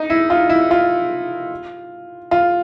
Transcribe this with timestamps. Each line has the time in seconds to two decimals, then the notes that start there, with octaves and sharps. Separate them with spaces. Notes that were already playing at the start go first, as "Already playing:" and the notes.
Already playing: D#4
0.10 E4
0.30 F4
0.49 E4
0.71 F4
2.31 F4